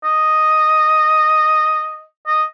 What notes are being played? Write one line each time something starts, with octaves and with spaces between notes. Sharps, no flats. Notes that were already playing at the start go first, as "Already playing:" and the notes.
D#5
D#5